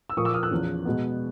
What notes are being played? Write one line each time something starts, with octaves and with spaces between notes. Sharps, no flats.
E6
A#2 F3 A#3 C#6 D#6
D6 E6
D#6 F6
E6 F#6
E2 C#3 F3
B2 G#3 B3